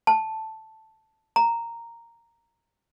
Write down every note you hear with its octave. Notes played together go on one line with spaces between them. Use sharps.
A5
A#5